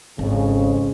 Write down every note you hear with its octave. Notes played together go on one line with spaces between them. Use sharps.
G#1 F2 C#3